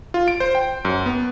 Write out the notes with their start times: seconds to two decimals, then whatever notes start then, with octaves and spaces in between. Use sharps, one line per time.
0.14 F4
0.28 D7
0.40 C5
0.55 G5
0.85 F#2
1.06 B3